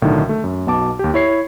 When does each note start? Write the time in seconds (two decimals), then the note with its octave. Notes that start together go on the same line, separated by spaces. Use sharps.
0.02 B1 A2 D3 D#3
0.29 A3
0.44 F#2
0.67 B1 B2 A5 D6
0.99 D#2 G4
1.14 E4 C#5 C7